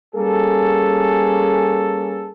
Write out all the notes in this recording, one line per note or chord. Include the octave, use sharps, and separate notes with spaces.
G3 A#3 C#4 G#4 A4